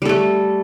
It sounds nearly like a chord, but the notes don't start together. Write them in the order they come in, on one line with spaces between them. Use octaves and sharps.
G3 A4 A3